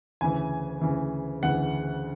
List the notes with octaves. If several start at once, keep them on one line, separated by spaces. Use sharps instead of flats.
D2 C#3 E3 G#5
D2 C#3 E3
D2 C#3 E3 F#5